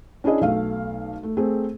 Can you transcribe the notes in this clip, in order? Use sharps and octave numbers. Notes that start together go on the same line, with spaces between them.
C#4 D4 E4 G#4 D#5
B1 A3 F5
A3
A3 C4 G#4